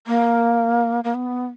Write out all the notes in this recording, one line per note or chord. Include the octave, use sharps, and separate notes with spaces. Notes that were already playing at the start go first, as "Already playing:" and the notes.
A#3
A#3
B3